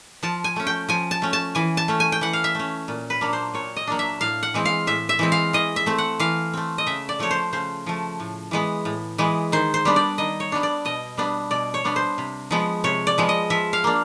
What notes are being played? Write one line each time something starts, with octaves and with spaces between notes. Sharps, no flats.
F3 A5
G#5
A3 C#4
G5
F3 G#5
A5
A3 C#4
A5
E3 G#5
A5
A3 C#4
G#5
G5
E3 F#5
F5
E5
A3 C#4
A#2
B4
F#3 A#3 D4
C5
A#2 C#5
D#5
F#3 A#3 D4
E5
A2 F5
F#5
E3 G#3 C4
F5
A2 E5
E5
E3 G#3 C4
F5
E3 D#5
E5
A3 C4
F#5
E3 F5
A3 C4
D#5
C#3 E5
D5
F3 A3 C#5
C5
C#3 C5
F3 A3
A2
E3 G#3 B3
A2
E3 G#3 B3
D#3 C5
C5
G3 B3 D4
D5
D#3 D#5
C#5
G3 B3 D4
D5
B2 D#5
G3 B3 D4
B2 D5
C#5
G3 B3 D4
C5
C3
F3 G#3 B3
C3 C#5
D5
F3 G#3 B3
D#5
F3 E5
F5
A#3 D4